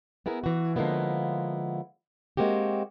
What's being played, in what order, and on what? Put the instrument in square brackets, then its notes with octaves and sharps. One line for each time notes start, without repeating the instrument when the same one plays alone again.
[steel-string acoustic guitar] B3 E4 G#4 A#4
E3 F#4
D3 F3 G#3 A#3 B3 E4
G#3 A#3 C4 F#4 G4